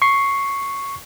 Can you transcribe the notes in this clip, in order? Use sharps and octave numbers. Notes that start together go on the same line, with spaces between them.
C#6 C7